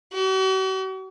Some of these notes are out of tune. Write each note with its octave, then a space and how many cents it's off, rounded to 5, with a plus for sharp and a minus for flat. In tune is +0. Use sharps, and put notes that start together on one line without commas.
F#4 +45